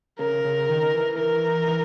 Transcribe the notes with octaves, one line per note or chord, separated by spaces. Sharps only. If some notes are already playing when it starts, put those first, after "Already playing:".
C#3 A#4
C#3
D#3
E3
A#4
E3